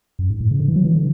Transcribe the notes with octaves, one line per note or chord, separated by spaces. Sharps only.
F#2
G#2
A2
C#3
D3
E3
F#3
E3
D3